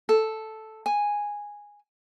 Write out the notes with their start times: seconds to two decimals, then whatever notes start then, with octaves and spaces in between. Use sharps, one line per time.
0.09 A4
0.86 G#5